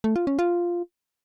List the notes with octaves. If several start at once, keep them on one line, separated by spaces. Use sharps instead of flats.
A3
F4
C#4
F4